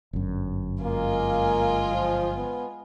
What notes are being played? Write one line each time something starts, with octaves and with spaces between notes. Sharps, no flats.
G1 F#2
G#3 A#3 F4 G#5
F3
B3